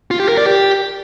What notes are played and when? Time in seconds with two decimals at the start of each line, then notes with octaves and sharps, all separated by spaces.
0.11 F4
0.20 G4
0.28 A#4
0.37 D5
0.46 G4